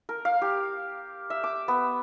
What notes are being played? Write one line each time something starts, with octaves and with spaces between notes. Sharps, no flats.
A#4
F5
G4
E5
D6
B3